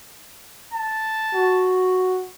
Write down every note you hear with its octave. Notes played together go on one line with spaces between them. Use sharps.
A5
F#4